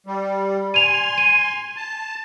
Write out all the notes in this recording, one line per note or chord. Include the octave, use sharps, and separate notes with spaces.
G3
G#5 C6 D#7 F7
D#7
A5